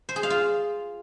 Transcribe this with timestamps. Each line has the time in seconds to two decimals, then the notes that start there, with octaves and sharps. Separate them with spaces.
0.09 C5
0.16 G#4
0.23 F5
0.30 F4